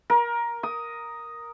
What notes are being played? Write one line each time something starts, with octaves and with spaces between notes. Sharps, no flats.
A#4
D#6